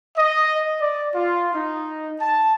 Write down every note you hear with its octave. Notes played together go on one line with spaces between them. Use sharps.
D#5
D5
F4
D#4
A5